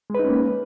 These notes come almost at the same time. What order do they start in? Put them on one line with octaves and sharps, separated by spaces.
G#3 B4 D#4 C#4 A#3